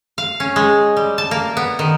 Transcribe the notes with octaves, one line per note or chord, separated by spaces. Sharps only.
F5
C#4
G#3
G3
A5
A#3
B3
D#3